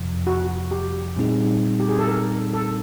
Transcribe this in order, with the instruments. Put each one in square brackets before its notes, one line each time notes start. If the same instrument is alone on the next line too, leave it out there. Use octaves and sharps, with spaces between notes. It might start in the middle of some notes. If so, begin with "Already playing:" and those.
Already playing: [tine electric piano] F2 C3 F3
[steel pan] F#4
G4
[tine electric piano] A#2 G3 C4 D#4 G#4
[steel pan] G4
G#4
A4
A#4
A4